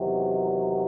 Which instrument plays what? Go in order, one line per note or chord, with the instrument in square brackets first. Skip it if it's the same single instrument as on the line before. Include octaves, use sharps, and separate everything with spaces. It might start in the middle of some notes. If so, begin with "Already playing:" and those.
Already playing: [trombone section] E2 C3 D#3 F#3
G#3